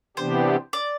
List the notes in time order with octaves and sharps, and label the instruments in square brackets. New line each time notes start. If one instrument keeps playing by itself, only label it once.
[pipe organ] C3 E3 B3 D4 G4 [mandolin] C5
[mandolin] D5